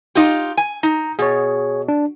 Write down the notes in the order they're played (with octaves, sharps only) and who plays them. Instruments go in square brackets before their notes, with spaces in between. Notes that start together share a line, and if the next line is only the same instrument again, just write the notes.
[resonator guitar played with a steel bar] D#4 F4 G4
G#5
[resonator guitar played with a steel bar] D#4 [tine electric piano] A#5
[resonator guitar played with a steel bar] B2 [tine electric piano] G#4 C#5
[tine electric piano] D4